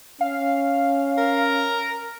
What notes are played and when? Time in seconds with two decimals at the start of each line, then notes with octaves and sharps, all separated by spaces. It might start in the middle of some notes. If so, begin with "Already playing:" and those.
0.21 C#4 F5
1.18 A#4